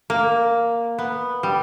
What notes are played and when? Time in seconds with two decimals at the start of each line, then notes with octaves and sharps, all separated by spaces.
0.10 A#3
0.98 B3
1.43 G3